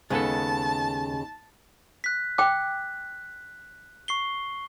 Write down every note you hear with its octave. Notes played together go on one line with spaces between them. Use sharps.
D#2 C#3 G#3 B3 A4 A5
F#6 B6
G5 D6 F#6
C#6 C7 G7